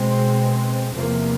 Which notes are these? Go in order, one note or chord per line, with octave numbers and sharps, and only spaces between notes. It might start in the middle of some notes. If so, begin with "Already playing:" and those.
Already playing: B2 G#3 C4
E2 C3 F3 A#3